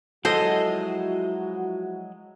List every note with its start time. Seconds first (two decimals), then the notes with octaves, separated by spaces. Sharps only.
0.25 F3 F#3 G#3 E4 F#4 A4 C5 D#5